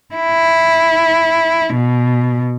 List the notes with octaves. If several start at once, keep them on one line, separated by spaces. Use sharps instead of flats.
E4
B2